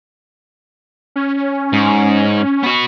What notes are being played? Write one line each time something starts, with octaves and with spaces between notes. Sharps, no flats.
C#4
G#2
B3 F#4